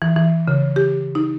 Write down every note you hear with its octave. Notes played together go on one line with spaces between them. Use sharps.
E3
E3
C#3
G4
D#4